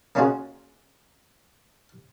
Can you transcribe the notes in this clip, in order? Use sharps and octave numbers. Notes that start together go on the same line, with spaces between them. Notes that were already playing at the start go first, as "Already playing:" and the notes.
A#3 C#4 D#4 F4 F#4 G#4